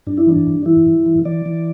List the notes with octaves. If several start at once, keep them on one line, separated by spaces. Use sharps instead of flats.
G2 D4
E4
E3 D4
G2
E3 E4
G2
E3
E3 D5
E3